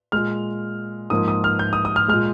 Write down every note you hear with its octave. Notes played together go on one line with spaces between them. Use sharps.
A#2 G#3 F6
G#2 F3 A#3 D#6
D#6
F6
G6
D#6
D#6
F6
A#2 G#3 F6